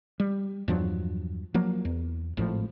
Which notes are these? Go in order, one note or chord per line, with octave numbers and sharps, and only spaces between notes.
G3
E2 G2 F3 F#3
F3 F#3 A#3
E2
G#1 A2 F3